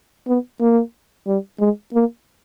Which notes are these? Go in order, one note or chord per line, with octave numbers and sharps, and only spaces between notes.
B3
A#3
G3
G#3
A#3